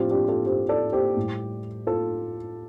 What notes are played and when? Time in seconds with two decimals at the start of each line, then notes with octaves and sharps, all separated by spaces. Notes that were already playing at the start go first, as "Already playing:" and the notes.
Already playing: A2 F3 C4 D4 F4 G4
0.10 D4 G4
0.28 F4 A4
0.46 G4 C5
0.69 A4 D5
0.92 G4 C5
1.17 A2 G3
1.87 F4 A4